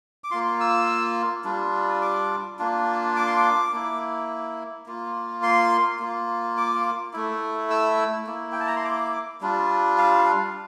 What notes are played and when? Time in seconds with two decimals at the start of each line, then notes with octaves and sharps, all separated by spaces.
0.24 D6
0.31 A#3 F4 C6
0.60 E6
1.45 G3 D4 F4
2.02 D6
2.59 A#3 D4 F4
3.16 D6
3.26 C6
3.37 D6
3.73 A#3 E4
4.86 A#3 F4
5.43 C6
6.00 A#3 F4
6.57 D6
7.13 A3 E4
7.70 E6
8.27 A#3 E4
8.52 G5
8.60 A5
8.67 A#5
8.76 C6
8.84 D6
9.41 G3 D4 F4
9.98 F5